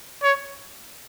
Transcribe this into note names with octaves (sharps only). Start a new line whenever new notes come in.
C#5